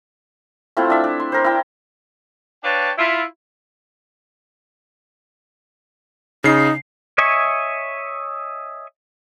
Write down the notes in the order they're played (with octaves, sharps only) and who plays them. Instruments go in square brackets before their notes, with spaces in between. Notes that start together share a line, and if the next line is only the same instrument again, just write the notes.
[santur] A3 C4 E4 F4
D4 E5
D4
C6
A#4 C5
E4 G5
[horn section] D4 B4 C#5 F5 G5 A5
E4 F4
[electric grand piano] C#3 C7 [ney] D#4
[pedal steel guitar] C#5 D#5 E5 G#5 C#6